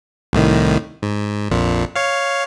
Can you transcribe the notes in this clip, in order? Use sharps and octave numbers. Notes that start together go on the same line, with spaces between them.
C2 A2 D#3
G#2
A#1 F2 A#2
C#5 F5